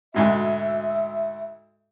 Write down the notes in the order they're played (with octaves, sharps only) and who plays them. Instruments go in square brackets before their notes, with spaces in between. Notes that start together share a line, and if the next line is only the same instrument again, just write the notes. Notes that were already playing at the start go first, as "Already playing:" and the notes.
[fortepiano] D2 G#2 B2 [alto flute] E5